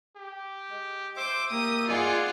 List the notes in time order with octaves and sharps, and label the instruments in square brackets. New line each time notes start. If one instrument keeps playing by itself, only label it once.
[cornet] G4
[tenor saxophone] G#3
[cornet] C5 [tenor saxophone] E5 [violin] D6
[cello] A#3 [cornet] G4 [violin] D#6
[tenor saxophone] D#4 [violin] F4 [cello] G#4 F#5 [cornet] D5